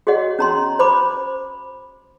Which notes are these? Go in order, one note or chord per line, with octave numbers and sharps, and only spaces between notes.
F#4 G#4 C#5 D#5 F#5
C#4 A#5 C6
C5 B5 D6